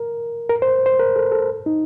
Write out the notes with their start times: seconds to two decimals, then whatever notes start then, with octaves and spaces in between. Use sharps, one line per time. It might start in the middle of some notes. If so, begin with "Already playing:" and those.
Already playing: A#4
0.49 A#4
0.62 C5
0.86 C5
1.00 A#4
1.16 A4
1.32 A4
1.66 D#4